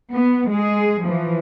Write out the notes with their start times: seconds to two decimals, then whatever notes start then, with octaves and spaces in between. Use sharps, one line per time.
0.12 B3
0.51 G#3 G#4
1.04 E3 F3